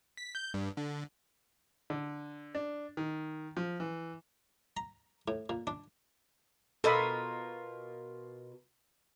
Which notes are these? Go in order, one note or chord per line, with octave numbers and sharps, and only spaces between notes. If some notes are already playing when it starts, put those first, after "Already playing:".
B6
G6
G2
D3
D3
D4
D#3
F3
E3
A#5
A2
A#2
D4
B2 F4 A4 A#4 D#5 B5